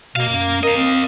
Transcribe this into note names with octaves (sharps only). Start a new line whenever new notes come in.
B2 A#3 F5
F#2
A#4 D#5 F5
C4